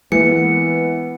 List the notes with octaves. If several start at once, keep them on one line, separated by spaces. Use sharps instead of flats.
E3 G#3 A#3 B3 C#7